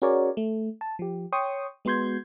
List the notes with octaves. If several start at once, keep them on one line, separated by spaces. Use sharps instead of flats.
C#4 F#4 G#4 A#4 C#5 D5
A3
A5
F3 G4
C#5 G5 C6 C#6 D#6
G#3 B3 F#4 C6 G6 G#6